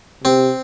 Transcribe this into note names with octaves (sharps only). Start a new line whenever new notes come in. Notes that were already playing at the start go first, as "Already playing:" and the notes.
C3 C4